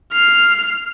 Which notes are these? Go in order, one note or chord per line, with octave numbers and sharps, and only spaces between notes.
F6 C7